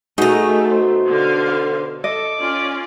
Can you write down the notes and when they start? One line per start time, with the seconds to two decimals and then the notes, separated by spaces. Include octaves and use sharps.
0.18 B2 A3 D#4 F#4 G#4 D#5 A#5
0.72 C5
1.08 D3 F5
2.04 A4 D#5 D6
2.39 C#4 F4 D5